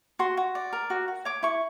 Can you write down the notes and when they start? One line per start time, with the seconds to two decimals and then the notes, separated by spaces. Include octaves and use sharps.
0.19 F#4 C6
0.37 F#4
0.55 D5
0.73 A#4
0.90 F#4
1.08 F#4
1.25 C#5 D6
1.43 E4 C#6